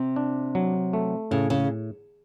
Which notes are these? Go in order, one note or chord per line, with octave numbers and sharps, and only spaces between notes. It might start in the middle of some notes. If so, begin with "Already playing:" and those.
Already playing: C3
D4
F#3
A3
A2 C#3
C#3